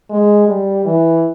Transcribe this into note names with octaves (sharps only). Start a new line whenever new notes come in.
G#3
G3
E3